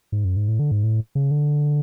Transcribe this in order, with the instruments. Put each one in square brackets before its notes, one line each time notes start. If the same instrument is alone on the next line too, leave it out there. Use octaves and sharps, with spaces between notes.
[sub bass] G#2
F#2
G#2
A2
D3
G#2
A2
C#3
D3